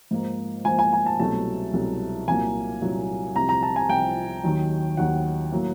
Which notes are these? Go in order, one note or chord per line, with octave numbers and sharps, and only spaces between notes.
G#2 F3 A#3
G#2 F3 A#3 G#5
G#5
G#5
A5
C2 B2 F#3 A3 A5
C2 B2 F#3 A3
C2 A#2 F#3 A#3 G#5
C2 A#2 F#3 A#3
C2 C3 F3 A#5
A#5
A5
G#5
C2 C3 F3 G5
D#2 D#3 F#3
D#2 D#3 F#3 F#5
A2 F#3 A#3